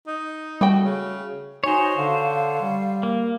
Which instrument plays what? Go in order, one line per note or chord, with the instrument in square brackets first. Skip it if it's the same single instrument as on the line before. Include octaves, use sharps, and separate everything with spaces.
[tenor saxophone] D#4
[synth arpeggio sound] G3 [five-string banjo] A3 F#4 G5
[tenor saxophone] C#3
[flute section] D#4 F#4 G#5 [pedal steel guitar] C5 C#5
[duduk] D3 [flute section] F5
[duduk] G3
[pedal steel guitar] A#3